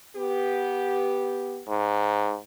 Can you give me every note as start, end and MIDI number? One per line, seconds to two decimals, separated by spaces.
0.16 1.62 59
0.16 1.62 67
1.69 2.38 44